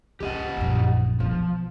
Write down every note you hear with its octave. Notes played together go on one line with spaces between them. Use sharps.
C#2 G4 D#5 F#5
A#1 F#2
B2 F3